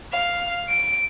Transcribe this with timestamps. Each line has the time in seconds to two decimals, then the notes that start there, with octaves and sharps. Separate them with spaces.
0.13 F5
0.69 D7